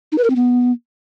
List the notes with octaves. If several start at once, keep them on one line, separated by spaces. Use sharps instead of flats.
D#4
B4
A#4
C4
B3